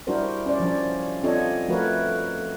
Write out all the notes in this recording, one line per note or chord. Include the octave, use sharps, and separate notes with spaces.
G3 D4 E4 F#4 A#4 C5
C#4 C5 D5
F3 D4
C4 D4 F4 A4 C#5 D#5
F3 A3 F#4 A#4 B4 C#5